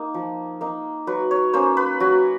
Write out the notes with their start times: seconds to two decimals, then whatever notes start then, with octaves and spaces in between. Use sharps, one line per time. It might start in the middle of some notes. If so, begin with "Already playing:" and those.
Already playing: A#3 D#4
0.14 F3
0.61 A#3 D#4
1.07 F#3 B4
1.31 C#5
1.53 A#3 C#4 C5
1.77 B4
2.00 F#3 F#4